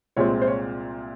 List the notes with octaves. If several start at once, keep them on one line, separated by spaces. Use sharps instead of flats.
C2 A#2 G#3 C4 C#5
C5
C#5